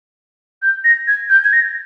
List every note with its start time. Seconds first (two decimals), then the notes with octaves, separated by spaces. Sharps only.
0.62 G6
0.84 A#6
1.08 G#6
1.30 G6
1.44 G#6
1.53 A#6